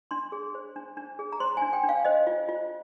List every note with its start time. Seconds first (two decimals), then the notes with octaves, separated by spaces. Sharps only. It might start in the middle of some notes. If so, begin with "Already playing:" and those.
0.11 D4 C6
0.32 G#4
0.55 C5
0.76 D4
0.97 D4
1.19 G#4
1.32 A#5
1.40 C5 C6
1.57 D4 G#5
1.73 G5
1.83 D4
1.89 F5
2.05 C5 D#5
2.27 F4
2.49 F4